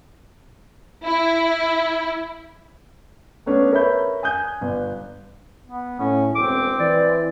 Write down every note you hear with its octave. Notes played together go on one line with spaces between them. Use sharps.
E4
A3 B3 C#4 D4
A#4 B4 C#5 E5 B5 G6
G#5 D#6 F#6 G6
G1
B3
A2 C#4
E1 C4 D6
E3 D5